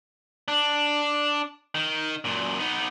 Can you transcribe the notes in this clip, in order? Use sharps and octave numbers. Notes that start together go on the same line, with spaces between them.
D4
D#3
F#2 A#2
B3 D#4